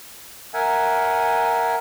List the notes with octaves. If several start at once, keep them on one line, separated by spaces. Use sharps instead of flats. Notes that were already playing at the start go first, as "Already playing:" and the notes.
A#4 E5 F#5 G#5